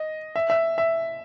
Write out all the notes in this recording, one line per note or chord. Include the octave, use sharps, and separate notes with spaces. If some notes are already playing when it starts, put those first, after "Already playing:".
Already playing: D#5
E5
E5
E5